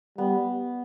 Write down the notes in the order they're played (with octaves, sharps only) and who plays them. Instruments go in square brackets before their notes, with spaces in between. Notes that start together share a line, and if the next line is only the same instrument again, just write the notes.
[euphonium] G3 [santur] B3